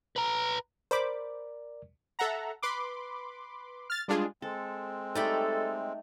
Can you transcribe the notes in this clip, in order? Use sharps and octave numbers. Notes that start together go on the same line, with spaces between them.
B4 A#5
A#4 C5 D5 B5 D6
A4 E5 F#5 A#5
B4 B5 C6 D6
F6 A6
G3 G#3 D4 F4 G#4
G#3 C4 A4
G3 A3 D#4 A4 D5 B5